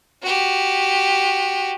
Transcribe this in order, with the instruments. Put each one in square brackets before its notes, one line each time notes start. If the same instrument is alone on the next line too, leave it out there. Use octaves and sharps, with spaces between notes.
[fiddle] F#4 G4